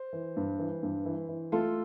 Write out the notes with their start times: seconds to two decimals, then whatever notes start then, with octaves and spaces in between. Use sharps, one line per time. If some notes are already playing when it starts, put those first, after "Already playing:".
Already playing: C5
0.13 E3
0.37 G2
0.59 E3
0.83 G2
1.05 E3
1.29 E3
1.52 A3 F4 A4